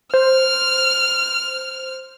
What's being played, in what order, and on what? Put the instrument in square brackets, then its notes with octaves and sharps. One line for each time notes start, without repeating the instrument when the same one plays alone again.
[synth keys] C5 [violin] F6